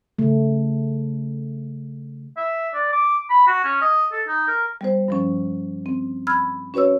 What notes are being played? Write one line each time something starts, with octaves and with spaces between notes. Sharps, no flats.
C#3 A3
E5
D5
D6
B5
F#4
C#4
D#5
A4
D#4
A#4
G3 B3 C5
G2 F3 C#4
C4
B5 E6 F6 G#6
C#4 F#4 B4 C#5 E6